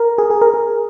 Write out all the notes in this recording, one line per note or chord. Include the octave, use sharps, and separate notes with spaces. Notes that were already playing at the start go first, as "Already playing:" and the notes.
Already playing: A#4
G#4
G#4
A#4
G#4